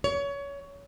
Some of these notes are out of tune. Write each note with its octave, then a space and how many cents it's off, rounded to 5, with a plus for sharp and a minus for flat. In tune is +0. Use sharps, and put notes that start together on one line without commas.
C#5 +25